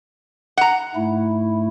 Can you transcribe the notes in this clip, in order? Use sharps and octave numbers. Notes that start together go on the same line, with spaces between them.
F#5 A#5
G#2 A3 E4